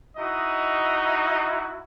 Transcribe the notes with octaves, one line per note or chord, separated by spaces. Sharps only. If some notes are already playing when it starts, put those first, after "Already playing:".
D#4 E4 F#4 D#5